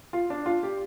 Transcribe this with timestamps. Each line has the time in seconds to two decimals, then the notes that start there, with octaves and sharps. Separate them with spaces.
0.13 F4
0.30 D4
0.46 F4
0.63 G4